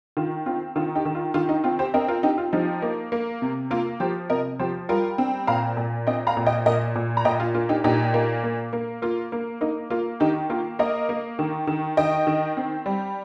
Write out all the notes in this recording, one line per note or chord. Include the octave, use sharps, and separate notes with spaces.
D#3 F4
C4 F4
D#3 F4
D#4 G4
D#3
F4
D#3 F4
D#4
C4 F4
G4 C5
C4 A#4 D#5
F4 A#4
C4 D#4 G4
F4
F3 D#4 G4
A#3
A#3
C3
A#3 F4 A#4
F3 G4 C5
C3 A#4 D#5
F3 G4 C5
G3 F4 A#4
C4
A#2 F5 A#5
A#2
C4 D#5 G5
F5 A#5
A#2
D#5 G5
A#2 A#4 D#5
A#2
A#5
A#2 D#5 G5
F4
A#3 F4
D#4 G4
A#2 D#4 G4
A#3
A#3
A#3
A#3 F4
A#3
A#3 D#4
A#3 F4
D#3 D#4 G4
A#3 F4 A#4
A#3 A#4 D#5
A#3
D#3
D#3
D#3 D#5 G5
D#3
C4
G3